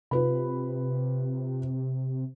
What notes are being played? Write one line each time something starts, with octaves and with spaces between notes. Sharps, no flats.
C3 F4 B4 B5